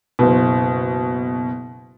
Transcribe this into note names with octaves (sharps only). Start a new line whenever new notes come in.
F#1 B2